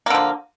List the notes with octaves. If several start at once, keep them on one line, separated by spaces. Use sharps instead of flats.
D3 F3 A#3